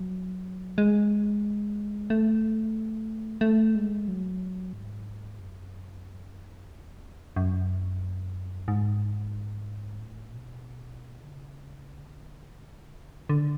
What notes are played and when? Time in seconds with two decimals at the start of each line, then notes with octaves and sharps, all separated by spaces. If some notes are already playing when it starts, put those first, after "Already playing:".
Already playing: F#3
0.78 G#3
2.10 A3
3.41 A3
3.75 G#3
4.08 F#3
4.73 G#2
5.39 F#2
6.70 E2
7.36 F#2
8.68 G#2
10.00 A2
10.33 B2
11.24 D3
11.32 C#3
11.97 D3
13.29 D3